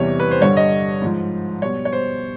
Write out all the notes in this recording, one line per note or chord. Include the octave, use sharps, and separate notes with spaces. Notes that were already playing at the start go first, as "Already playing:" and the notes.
Already playing: E2 C3 E3 G3 C#5
B4
C5
G2 D3 G3 C#5
D#5
G#2 F3
B2 G3 C#5
C#5
C5